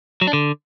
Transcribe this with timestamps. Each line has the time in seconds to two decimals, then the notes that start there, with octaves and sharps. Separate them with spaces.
0.22 F#3
0.27 D4
0.33 D3